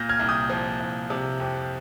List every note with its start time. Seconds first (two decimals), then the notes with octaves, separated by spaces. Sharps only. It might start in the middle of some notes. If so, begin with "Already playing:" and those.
Already playing: A#2 G6 A#6
0.09 F6 G#6
0.19 C2
0.29 D#6 G6
0.50 F3
0.80 C2
1.10 C3
1.40 F2